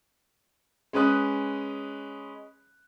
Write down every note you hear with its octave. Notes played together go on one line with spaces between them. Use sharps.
G#3 C#4 B4 D#6 F#6